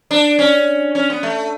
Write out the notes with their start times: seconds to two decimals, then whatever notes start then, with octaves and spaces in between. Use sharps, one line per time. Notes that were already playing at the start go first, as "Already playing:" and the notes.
0.11 D4
0.39 C#4
0.95 C#4
1.10 B3
1.23 A3